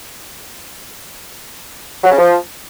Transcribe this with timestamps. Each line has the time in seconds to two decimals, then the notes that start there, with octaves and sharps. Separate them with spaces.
2.04 F#3
2.11 C#3
2.18 F3